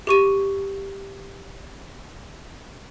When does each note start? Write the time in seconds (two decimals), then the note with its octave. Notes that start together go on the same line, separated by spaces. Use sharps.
0.07 G4 C#6 D#7